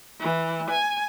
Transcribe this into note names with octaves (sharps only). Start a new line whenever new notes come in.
E3
G#5